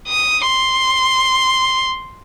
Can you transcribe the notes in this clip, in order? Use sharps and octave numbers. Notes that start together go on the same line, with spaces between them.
D#6
C6